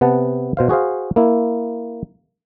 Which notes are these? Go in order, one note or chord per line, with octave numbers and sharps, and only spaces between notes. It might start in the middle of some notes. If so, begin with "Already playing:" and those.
C3 B3 F#5 A5
B2 C5 F5
F#4 G#4 C5 F5
A#3 E4